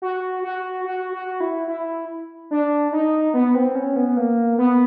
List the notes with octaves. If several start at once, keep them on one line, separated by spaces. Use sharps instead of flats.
F#4
F#4
F#4
F#4
E4
E4
D4
D#4
B3
C4
C#4
B3
A#3
B3